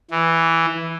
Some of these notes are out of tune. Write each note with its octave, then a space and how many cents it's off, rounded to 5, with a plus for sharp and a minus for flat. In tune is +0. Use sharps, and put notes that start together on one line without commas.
E3 +0